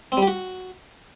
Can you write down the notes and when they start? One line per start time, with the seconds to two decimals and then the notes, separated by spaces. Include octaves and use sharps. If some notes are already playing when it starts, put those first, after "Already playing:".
0.12 C4
0.17 G3
0.22 G4
0.27 F#4